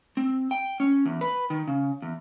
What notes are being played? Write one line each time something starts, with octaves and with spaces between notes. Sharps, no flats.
C4
G5
C#4
E2
B4
D#3
C#3
E2